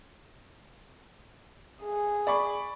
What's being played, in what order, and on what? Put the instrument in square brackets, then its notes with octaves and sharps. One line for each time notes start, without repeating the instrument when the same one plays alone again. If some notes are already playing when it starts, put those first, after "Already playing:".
[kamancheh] G#4
[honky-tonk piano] D5 B5 C#6